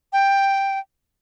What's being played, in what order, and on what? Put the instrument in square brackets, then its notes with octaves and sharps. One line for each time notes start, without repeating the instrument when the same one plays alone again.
[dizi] G5